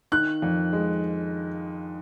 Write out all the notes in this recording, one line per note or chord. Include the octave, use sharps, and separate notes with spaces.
D#3 F#6
F2
G#3